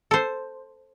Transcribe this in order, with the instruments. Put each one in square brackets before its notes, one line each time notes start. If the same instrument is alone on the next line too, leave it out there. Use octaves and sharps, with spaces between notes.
[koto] A4 C5